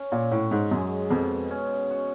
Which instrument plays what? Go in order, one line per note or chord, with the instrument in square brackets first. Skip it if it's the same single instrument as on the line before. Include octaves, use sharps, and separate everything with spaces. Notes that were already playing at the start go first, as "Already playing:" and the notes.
Already playing: [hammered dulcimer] C#4
[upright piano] A#2
[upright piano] A2 [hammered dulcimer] F#4
[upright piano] G#2
[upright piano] F#2 [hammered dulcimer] G#3
[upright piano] F2 [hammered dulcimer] B2
[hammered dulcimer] C#4
F#4